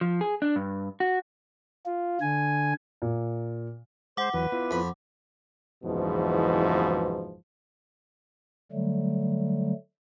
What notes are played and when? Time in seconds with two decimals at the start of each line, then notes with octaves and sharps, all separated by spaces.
0.01 F3
0.21 G#4
0.42 D4
0.56 G2
1.00 F#4
1.86 F4
2.21 D3 G#5
3.02 A#2
4.17 G#3 C5 F#5 D6
4.33 E2 E3 F#3 B4
4.52 B3 E4 F4
4.71 F2 B5
5.84 F#1 E2 G#2 B2 E3 F3
8.72 D3 F#3 G3 A3